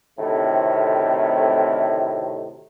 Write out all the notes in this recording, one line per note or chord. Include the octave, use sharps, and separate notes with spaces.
D2 A2 C3 D#3 A3 C4